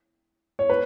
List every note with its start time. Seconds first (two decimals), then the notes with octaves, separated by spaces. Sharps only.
0.59 C#5
0.69 B4